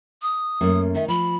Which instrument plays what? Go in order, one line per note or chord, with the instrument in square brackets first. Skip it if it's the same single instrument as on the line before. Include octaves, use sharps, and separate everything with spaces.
[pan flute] D#6
[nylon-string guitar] F#2 A3 A#3
[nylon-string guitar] D#3 [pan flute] E5
[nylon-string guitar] F3 [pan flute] B5